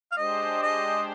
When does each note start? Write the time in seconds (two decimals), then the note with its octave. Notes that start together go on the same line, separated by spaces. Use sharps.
0.12 F5
0.17 G#3 D4 G4 C5 D#5
0.62 D#5